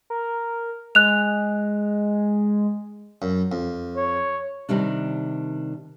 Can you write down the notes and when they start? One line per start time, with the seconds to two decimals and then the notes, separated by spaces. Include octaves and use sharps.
0.10 A#4
0.95 G#3 F#6 F7
3.22 F#2
3.52 F2
3.97 C#5
4.69 C3 D#3 G3 D4